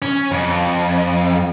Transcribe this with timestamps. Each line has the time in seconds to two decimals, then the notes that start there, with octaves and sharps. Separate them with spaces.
0.02 C#4
0.32 F2